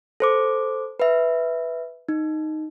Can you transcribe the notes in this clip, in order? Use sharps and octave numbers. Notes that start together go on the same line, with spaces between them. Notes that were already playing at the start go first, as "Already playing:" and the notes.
A4 C5 D6
B4 E5
D#4